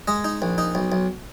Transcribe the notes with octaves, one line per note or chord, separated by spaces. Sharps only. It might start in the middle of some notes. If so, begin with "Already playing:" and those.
G#3 D#5
D#4
A#1
D#4
B1
B1